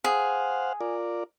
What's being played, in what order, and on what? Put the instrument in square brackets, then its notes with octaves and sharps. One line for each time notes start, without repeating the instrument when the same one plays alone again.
[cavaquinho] G#4 [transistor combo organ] C5 F5 F#5
[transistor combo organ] F4 A#4 D5